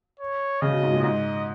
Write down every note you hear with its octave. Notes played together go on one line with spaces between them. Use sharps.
C#5
C#3 D#5
B2
G#2
A#2
G#2 D#5